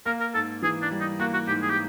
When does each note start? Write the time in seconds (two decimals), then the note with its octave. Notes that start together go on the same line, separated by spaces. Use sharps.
0.06 A#3 A#4
0.21 A#4
0.34 G#2 A4
0.62 E3 G#4
0.82 D4
0.91 G3
1.00 D#4
1.20 A#3 F#4
1.33 F#4
1.47 G#2 G4
1.62 G#4
1.70 G4